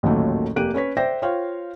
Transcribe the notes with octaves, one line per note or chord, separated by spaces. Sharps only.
A1 D#2 A#2 D#3 F#3 A3
F1 A#3 G4 F#6 D7 D#7
C#4 B4 C#5 B6
C5 D5 E5 G5 A#6
F4 C5 C#5 F5 G5